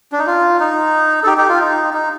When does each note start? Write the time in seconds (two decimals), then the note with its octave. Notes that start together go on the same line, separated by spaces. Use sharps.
0.12 D4
0.19 D#4
0.27 F4
0.60 D#4
1.23 A4
1.26 D#4 G4
1.38 D#4 G4
1.49 F4
1.60 D#4
1.94 D#4